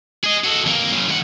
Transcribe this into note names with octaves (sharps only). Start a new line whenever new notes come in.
G#4 D#5
F#4 A4
F2 A#3
F#2 C#3
D#2 F#5